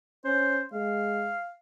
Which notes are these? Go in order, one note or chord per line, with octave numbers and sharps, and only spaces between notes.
C#4 C5
G#3 F5